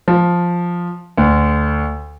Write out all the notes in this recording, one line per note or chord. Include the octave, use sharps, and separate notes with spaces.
F3
D2